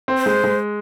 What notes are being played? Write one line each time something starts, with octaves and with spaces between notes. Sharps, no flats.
C4
C5
G#3
G#3